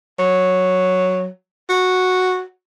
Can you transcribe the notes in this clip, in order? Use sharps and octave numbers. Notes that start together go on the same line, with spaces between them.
F#3
F#4